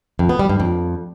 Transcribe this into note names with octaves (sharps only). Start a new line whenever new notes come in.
F2
B3
G3
G2
F2